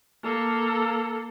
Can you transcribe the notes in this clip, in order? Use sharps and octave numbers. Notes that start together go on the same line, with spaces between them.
A#3 A4